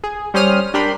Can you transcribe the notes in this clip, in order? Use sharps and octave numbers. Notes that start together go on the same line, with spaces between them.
G#4
G3 C#4 C5 D#6 F6 D#7
D4 G4 A#4 B5 C6